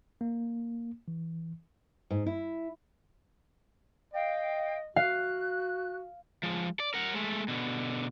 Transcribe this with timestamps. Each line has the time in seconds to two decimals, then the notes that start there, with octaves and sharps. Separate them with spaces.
0.21 A#3
1.08 E3
2.11 G#2
2.26 E4
4.13 D#5 F5 G5
4.96 F#4 F5 F#6
6.43 F3 G#3
6.80 D5
6.94 A#4 F#5
7.14 G#3 A3
7.48 B2 D3